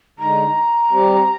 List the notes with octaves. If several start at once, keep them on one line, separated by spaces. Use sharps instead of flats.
D3 G#3 D#4 A#5
G3 C4 G4